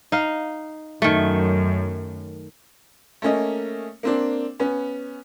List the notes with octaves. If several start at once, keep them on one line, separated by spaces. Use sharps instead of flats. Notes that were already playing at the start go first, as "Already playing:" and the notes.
D#4 F5
F#2 D#3 A3
A3 A#3 C#4 D#5
A#3 C4 D4
B3 C#4